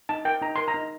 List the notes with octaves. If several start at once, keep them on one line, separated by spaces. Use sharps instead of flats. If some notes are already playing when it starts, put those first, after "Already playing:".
D#4 A5
A#4 G5
D#4 A#5
A#4 C6
A#5
D#4